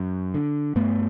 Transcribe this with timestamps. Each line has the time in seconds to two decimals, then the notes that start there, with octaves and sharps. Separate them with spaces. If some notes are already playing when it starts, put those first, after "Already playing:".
Already playing: F#2
0.34 D3
0.76 G2 A3 B3